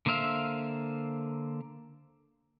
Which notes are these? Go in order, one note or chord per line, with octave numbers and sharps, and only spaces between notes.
D3 A#3 C5 E5 F5